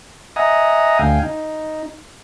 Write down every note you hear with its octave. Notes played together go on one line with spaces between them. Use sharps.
D#5 E5 F#5 G#5 A#5 D#6
D2 F5 G5 G#5
D#4